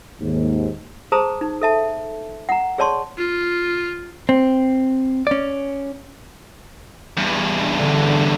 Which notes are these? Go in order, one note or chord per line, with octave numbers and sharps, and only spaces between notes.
D#2 G#2
G#4 C5 A5 A#5 D#6
D#4
A4 E5 A5
F#5 A#5
G#4 C#5 D5 A5 C6 C#6
F4
C4
C#4 D5
E2 G2
D3